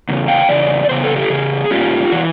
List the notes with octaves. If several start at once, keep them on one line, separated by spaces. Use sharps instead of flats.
E2 C#3
F5 G5
E2 C#3 D5
E2 C#3 C5
A4 B4
G4 A4
E2 C#3 G#4
G#2 E3 G#3 C#4 F4 G4
E3 F#4